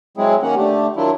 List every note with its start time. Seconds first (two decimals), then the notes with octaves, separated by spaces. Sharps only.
0.17 F#3 G#3 C4 E4 G#4
0.43 D#3 A#3 C#4 D#4 F#5
0.56 D3 A3 G4
0.96 D#3 F#3 D4 E4 F4